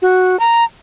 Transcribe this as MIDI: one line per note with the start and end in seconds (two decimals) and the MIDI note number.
0.02 0.39 66
0.39 0.64 82